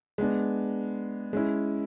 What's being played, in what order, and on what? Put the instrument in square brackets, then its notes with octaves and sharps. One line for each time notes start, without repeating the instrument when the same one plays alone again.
[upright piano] G#3 B3 D4
G#3 C#4 E4